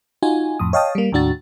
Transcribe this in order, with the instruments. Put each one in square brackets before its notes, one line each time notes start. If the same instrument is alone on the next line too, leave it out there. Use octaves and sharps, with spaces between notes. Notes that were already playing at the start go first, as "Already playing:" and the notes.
[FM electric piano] D#4 F4 F#4 G#5
F2 A2 D#6
C#5 D#5 F5 G5 A5 D#6
G3 A#3
D#2 A2 D4 F#4 A6